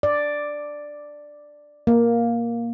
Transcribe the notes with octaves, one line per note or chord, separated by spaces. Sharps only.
D5
A#3